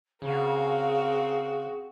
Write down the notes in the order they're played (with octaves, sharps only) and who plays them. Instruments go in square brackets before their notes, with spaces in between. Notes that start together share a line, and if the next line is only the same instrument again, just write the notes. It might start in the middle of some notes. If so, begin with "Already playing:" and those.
[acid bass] C#3 [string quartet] C4 F#4 [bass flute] G#4 [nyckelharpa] A#4 F5